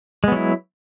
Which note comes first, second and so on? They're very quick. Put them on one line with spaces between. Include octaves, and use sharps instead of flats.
G#3 B3 F#3 E4